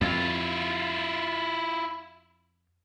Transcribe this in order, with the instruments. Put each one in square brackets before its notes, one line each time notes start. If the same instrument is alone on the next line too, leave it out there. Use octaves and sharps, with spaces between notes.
[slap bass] F2 [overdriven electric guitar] E4 F4